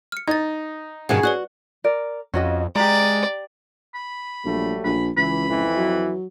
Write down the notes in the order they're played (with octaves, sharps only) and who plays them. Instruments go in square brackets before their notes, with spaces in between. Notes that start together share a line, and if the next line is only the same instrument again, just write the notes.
[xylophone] F6 C#7
[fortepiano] D#4 [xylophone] G#6 A6
[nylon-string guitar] G2 B2 D#3 [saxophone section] C#4 G#4 [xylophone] F#5
[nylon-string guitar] F#4 [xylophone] B4 D5 F#6
[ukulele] A#4 D5
[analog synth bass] F2 [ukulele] C#4 F#4 D#5
[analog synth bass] G#3 [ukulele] G4 A#5 [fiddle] D5
[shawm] B5
[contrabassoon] A#1 [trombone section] F#3 G3 A3
[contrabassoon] A#1 [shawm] B5
[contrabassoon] C#2 [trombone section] E3 [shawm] B5
[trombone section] F2 E3
[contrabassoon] F#3